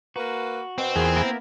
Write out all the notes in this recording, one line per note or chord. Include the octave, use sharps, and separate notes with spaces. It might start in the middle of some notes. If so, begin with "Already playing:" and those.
A#3 F#4 B4
B2 C4
E2 A#2 G#4
A#3 B3 E4 A#4